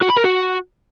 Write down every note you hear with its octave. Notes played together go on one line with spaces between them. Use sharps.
F#4
B5
A#4
F#4